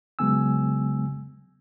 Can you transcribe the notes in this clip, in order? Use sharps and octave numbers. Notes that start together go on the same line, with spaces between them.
C#3 F#3 G#3 B3 G#5 E6